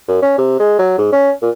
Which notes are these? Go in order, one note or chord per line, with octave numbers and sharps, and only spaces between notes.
F#2
C#4
C3
G#3
F#3
G#2
C#4
A#2